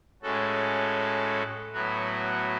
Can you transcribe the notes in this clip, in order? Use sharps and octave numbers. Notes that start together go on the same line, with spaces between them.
A2 G#3 C#4 F#4 A4
A2 F#3 B3 F#4